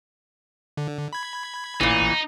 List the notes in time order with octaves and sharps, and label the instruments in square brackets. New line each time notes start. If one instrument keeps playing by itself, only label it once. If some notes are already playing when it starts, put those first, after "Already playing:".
[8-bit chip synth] D3
B5 G#6
[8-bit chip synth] A1 [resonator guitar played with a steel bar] A#2 E3 [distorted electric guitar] D#4